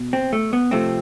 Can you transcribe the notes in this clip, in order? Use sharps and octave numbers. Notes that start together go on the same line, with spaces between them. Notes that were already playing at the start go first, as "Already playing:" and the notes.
Already playing: B2
C4
A3
B3
C3 F3 A3 C4